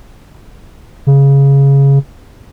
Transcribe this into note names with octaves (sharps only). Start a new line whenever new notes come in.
C#3